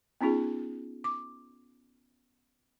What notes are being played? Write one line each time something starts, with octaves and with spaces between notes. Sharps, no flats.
B3 C#4 D#4 F4 G#4
D6